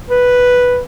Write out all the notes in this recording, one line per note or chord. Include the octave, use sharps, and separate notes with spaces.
B4